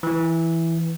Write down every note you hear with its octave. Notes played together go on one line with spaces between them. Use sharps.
E3